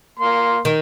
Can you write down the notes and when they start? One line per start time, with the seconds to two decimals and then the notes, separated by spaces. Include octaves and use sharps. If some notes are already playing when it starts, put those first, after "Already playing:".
0.19 A#3 C6
0.65 D#3